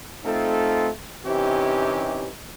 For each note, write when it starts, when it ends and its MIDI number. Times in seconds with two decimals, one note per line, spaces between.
0.25 0.89 57
0.25 0.89 60
0.25 0.89 63
0.25 0.89 65
0.25 0.89 69
1.26 2.28 48
1.26 2.28 52
1.26 2.28 61
1.26 2.28 63
1.26 2.28 67